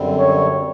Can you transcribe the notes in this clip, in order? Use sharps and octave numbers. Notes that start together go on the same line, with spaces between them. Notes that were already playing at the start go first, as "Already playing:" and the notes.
Already playing: F#2 D3 G3 C4
C#5